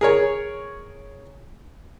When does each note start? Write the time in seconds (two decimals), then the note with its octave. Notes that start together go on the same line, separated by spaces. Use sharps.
0.01 G#4 A#4 C#5